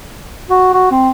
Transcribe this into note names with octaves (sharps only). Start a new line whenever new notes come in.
F#4
F#4
C4